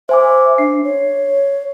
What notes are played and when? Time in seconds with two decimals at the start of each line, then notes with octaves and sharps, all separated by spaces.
0.09 C5 E5 G#5 D6
0.58 D4 C7
0.84 C#5